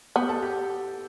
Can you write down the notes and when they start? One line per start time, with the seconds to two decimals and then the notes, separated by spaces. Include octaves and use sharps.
0.16 B3 G4
0.29 A4
0.42 G4